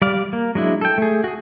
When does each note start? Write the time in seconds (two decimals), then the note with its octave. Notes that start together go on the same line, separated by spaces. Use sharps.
0.02 G3 D5 F5
0.33 A#3
0.55 F#3 G#3 D4 E4
0.81 A4 G5
0.98 A3 G#4
1.24 F#4 G#4